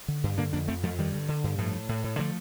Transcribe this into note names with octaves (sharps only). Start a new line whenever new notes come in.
D3
G2
D3 A#3 D4
F2 A#3 D4
F2 A3 C4
F2 F3 A3
G2 D#3 G3
D3
D3
G2
A2 F3 A3
A2
A2
A2
D3 F3 A3